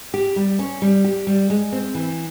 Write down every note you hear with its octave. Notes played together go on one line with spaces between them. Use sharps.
G4
G3
C#4
G3
G4
G3
G#3
C4
E3